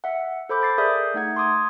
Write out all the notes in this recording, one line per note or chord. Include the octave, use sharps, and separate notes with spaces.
E5 F#5
A4 C5 B5 D6 G6
D6 A6 C7
G#4 A#4 D5 E5 D#6 G6
A3 D#4 F#5 G#6
C6 D6 D#6 G#6